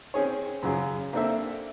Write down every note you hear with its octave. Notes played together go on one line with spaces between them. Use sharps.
C4 C#4 G#4 C#5
F#2 C#3 F#3 F4 G#4
A#3 C4 D4 A4 E5